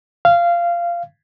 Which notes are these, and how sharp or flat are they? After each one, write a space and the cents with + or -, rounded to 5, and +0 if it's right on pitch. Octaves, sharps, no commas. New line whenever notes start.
F5 -15